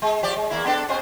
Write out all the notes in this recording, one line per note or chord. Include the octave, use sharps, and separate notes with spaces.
G#3
F3 G4 D5
G#3
E2 A#3 E4
B3 D4 A4
B2 C4 C5